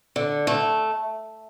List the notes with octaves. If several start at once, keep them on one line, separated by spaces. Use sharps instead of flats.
D3
A3